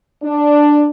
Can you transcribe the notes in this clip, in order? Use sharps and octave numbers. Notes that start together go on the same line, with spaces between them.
D4